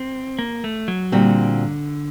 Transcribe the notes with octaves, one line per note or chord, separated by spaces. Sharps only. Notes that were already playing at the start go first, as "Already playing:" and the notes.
Already playing: C4
A#3
A3
F#3
A#2 D3 G3 C4 F#4